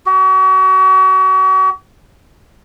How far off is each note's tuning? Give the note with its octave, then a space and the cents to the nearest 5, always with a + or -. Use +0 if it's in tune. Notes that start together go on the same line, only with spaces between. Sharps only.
F#4 +40